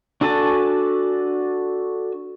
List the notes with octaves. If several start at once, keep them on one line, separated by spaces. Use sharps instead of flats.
D4 F#4 A4 G#5 A5